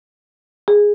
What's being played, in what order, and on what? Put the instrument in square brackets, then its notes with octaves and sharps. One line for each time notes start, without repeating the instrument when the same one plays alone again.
[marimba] G#4